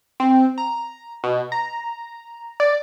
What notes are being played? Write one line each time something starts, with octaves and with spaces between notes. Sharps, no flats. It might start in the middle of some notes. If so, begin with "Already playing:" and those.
C4
A#5
B2
A#5
D5